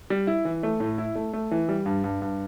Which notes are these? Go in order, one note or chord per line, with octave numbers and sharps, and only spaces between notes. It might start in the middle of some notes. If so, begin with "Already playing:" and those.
G3
E4
E3
A3
A2
E4
A3
A3
E3
G3
G2
G2
G2